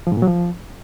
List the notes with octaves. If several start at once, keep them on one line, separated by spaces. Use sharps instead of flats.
F3
G#2
A#2
F#3
F3